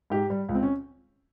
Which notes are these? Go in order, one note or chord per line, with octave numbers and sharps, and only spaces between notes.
G#2 G4
G3
C#2
C4
C#4